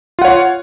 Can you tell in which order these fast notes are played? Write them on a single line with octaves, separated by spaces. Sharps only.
F4 F#5 C#5